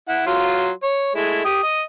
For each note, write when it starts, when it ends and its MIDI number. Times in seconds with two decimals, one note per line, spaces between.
0.09 0.24 64
0.09 0.24 78
0.27 0.70 54
0.27 0.70 65
0.27 0.70 84
0.83 1.10 73
1.15 1.44 56
1.15 1.44 57
1.15 1.44 64
1.45 1.63 67
1.45 1.63 87
1.63 1.81 75